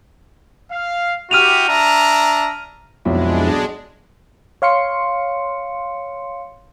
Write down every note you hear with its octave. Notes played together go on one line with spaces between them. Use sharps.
F5
E4 F#4 G4 F6 D#7 F7
D4 E5 A#5
B1 F2 G#3 D4 E4
C#5 F5 C6 C#7